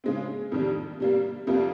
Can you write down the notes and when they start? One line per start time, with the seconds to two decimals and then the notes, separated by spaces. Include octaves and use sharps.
0.04 C#3 G#3 C4
0.52 F2 C3 D#3 G3
1.00 C3 G3 A#3
1.47 F2 C3 G3 A#3 F4